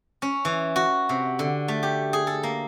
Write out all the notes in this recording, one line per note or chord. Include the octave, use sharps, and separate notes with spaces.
C#4
E3
F#4
C3
D3
A3
G4
G#4
A4
A#3